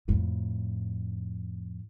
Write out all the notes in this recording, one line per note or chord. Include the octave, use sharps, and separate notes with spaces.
F2 A2